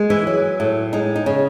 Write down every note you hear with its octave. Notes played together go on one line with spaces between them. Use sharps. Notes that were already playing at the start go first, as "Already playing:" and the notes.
Already playing: G#3
E3 E4
F#3
A2
G#3 D#4
D#4
C#3